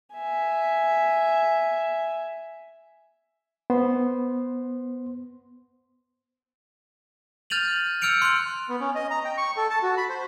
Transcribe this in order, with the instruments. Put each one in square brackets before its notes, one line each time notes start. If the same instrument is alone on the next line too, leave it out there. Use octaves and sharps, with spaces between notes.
[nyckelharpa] E5 G#5
[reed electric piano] B3 C5 C6
[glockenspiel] F6 G6 A6 D#7 F7 F#7
E6 F6 G6 C#7 D7 F7
C6 F#6
[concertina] B3
C#4
D#5
A#5
G5
C#6
A4
A5
F#4
B5
C5